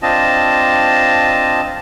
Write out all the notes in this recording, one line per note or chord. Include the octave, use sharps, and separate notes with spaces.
C4 D4 F4 D#5 A5